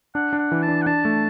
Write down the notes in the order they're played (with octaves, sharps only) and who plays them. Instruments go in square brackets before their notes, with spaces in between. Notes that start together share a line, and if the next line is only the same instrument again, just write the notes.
[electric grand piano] D4 [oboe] F#5
[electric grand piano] D4
[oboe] F#5
[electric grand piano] E3
[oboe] A5
[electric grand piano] D4
[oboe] F#5
[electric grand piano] D4 [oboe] A5
[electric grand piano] A3